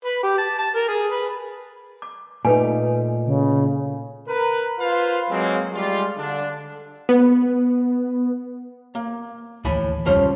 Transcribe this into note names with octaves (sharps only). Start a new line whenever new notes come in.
B4
G4
A5
A5
A#4
G#4
B4
D6
A#2 A3 D#4 B4 G#5
C#3
A#4 B4
F4 B4 C5 F5
F#3 G#3 A#3 C4
G3 G#3 F4
D3 D4
B3
A#3
D1 D#2 A2 E3 G#5 B5
F1 C3 F3 G3 C#4 F4